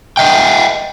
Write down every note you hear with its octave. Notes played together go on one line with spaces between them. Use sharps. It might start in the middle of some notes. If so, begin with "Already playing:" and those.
D#5 E5 G5